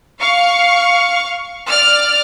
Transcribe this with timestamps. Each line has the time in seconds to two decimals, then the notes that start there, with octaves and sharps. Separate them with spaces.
0.21 F5 C#6
1.68 D5 F6